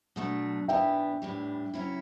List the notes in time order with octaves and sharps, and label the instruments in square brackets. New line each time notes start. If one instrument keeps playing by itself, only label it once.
[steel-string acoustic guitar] B2 F#3 A3 D4
[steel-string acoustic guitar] E3 B3 D4 [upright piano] E5 G5
[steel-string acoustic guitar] A2 E3 G3 D4
C#3 F#3 C#4 E4